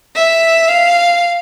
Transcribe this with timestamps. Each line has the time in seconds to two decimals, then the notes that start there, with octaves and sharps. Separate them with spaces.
0.16 E5
0.68 F5